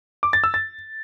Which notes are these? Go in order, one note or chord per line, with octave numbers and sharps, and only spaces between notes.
D6
A6
E6
A6